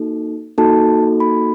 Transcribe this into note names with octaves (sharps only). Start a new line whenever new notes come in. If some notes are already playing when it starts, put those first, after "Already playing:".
Already playing: A#3 D#4 F#4 A4
A#3 D#4 F#4 A4 A5
B5